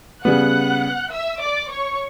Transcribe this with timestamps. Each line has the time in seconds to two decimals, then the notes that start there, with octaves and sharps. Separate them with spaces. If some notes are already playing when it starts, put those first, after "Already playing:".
0.24 C#3 G3 B3 F#5 F#6
1.12 E5 E6
1.41 D5 D6
1.70 C#5 C#6